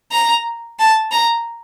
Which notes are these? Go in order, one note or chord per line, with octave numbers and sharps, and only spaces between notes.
A#5
A5
A#5